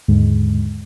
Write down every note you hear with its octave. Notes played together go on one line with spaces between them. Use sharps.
D#2 G#2 D3 G#3